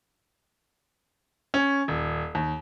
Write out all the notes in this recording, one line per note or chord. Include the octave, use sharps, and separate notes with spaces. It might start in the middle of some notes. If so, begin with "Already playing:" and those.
C#4
D#1
D#2